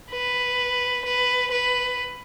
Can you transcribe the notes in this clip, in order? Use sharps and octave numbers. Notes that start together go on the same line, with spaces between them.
B4
B4
B4